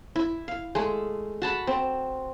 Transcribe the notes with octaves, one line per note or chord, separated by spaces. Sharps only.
E4
F5
G#3 A3
F#4 A5 B5
C4